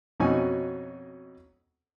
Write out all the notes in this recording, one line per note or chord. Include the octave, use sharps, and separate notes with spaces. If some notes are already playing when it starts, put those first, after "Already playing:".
F2 B2 C#4 D#4 F#4 G#5